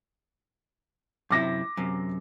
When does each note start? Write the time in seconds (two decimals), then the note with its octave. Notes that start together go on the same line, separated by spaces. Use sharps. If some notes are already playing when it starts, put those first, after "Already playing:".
1.31 F#2 C3 E4 D6 A#6
1.77 F#2 C3